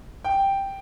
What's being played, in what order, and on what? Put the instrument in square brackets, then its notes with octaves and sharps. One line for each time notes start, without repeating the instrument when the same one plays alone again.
[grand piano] G5